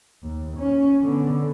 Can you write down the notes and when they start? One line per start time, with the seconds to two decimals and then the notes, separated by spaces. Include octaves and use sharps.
0.23 D#2
0.58 C#4
1.03 D3 B3